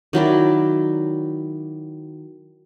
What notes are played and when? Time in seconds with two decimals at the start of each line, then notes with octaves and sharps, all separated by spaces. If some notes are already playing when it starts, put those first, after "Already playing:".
0.13 D#3 F#3 E4 D5